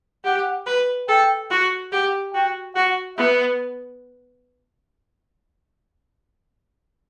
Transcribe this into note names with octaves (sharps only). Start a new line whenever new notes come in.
G4 F#5
B4
A4 G5
F#4
G4 F#5
F#4 G5
F#4 F#5
B3 E5